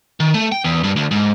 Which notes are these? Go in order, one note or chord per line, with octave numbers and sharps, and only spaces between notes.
D#3
A3
G5
E2
G2
D2
G#2